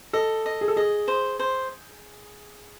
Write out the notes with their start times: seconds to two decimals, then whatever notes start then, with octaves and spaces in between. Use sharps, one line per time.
0.13 A4 D#5
0.46 D#5
0.61 G#4
0.68 A4
0.76 G#4 D#5
1.08 C5
1.39 C5